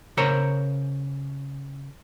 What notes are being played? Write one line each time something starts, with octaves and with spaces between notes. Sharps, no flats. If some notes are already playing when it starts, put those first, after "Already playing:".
C#3 A#4 C5 C#5 A#5